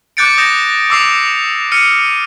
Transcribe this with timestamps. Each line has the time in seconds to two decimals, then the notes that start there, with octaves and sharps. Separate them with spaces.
0.17 D6 F#6 G6 A6 C#7 D7
0.38 D#6 G6 A#6 E7
0.90 D6 E6 C7 F7
1.72 E6 F6 C#7 D#7